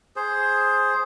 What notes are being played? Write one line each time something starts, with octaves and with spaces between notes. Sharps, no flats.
G#4 C5